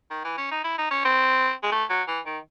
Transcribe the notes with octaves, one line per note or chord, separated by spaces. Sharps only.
D#3
E3
C#4
D#4
E4
D#4
C#4
C4
G#3
A3
F#3
E3
D#3